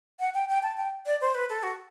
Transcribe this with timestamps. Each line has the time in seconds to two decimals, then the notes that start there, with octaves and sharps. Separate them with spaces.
0.20 F#5
0.35 G5
0.49 G5
0.63 A5
0.77 G5
1.06 D5
1.21 C5
1.35 B4
1.50 A4
1.63 F#4